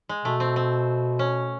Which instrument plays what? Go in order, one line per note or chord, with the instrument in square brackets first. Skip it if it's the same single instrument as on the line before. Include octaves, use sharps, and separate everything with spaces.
[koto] G#3
[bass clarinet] B2 [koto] A3
[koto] C4
C4
C#4